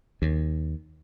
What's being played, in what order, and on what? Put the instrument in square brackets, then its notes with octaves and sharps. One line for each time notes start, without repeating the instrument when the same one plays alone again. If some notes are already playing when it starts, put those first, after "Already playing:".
[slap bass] D#2